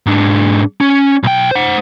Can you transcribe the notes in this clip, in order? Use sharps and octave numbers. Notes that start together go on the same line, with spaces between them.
G#2 D4
C#4
B1 G5
C5 F#5